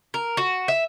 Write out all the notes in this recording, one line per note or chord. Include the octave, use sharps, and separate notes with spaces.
A#4
F#4
E5